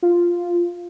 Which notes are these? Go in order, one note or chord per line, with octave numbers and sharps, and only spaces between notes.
F4